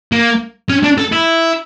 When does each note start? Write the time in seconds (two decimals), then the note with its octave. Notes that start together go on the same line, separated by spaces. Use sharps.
0.12 A#3
0.70 C#4
0.84 D4
0.98 A4
1.12 E4